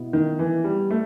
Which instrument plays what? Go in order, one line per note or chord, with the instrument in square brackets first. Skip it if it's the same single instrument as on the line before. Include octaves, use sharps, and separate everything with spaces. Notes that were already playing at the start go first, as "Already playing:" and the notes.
Already playing: [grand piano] B2 B3 E4
[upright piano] D#3
E3
G3
A3